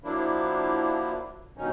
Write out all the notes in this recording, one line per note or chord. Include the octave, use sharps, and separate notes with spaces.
F3 F#3 A#3 D4 E4
G2 B2 D#3 F#3 C#4 D#4